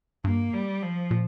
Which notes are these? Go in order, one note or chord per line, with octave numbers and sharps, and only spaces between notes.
G2 A#3
G3
F3
A#2